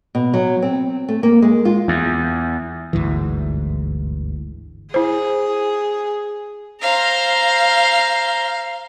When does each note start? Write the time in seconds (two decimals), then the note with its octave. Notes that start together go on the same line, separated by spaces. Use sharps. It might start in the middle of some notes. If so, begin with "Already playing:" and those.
0.15 B2
0.34 F#3
0.62 C4
1.09 A3
1.23 A#3
1.42 G#3
1.65 F4
1.88 E2
2.93 G1 D2 G#2 E3
4.94 E4 G#4 C5
6.82 C5 F5 A#5